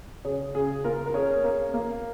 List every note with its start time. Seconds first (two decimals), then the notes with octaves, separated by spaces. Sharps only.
0.25 C#3 G#4 C#5
0.55 C#3 G#4
0.84 A#3 F4 A#4
1.06 A#4
1.14 C#4 G#4 C#5
1.44 A#3
1.74 A#3